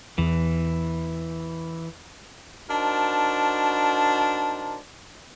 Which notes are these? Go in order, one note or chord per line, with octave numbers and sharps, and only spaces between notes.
E2 E3
D4 D#4 F#4 A#4 C5 A5